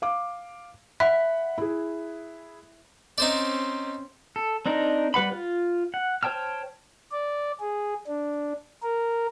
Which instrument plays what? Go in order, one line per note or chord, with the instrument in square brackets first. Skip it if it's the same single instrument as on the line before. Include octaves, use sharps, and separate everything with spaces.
[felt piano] F5 D6
[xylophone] E5 [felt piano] F#5 B5 F#6
[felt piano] E4 G#4
[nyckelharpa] C4 C#4 [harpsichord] D#4 C5 D5
[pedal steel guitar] A4
C4 D4 D#4 A#4
G3 B4 F#5 B5
F4
F#5
C5 C#5 G5 A5 F6
[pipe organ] D5
G#4
D4
A#4